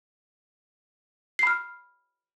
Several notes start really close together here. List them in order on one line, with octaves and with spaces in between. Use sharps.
C7 B5 F6